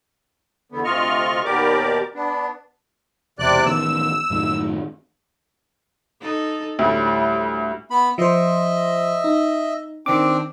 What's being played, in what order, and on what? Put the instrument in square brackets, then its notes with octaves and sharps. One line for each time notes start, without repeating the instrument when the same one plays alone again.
[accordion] E2 D3 B3
D2 C3 F4 D#5 C#6 F6
D#2 B2 G4 A#4 D5 D6
B3 D4
[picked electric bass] E1 [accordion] C3 D5 F#6
[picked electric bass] A1 D#3 B3 [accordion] E6
[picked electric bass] F#2 A2 D#3
[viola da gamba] D#4 A4
[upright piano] D2 [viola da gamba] A2 G3
[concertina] B3 B5
[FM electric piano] F3 C5 [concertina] D#5 E5
[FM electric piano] D#4
[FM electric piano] D#3 D6 [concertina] C4 D4